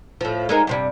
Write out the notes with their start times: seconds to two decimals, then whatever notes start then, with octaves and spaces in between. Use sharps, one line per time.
0.21 A2 F3
0.49 G#3 D#4 A#4
0.67 G2 C3 G3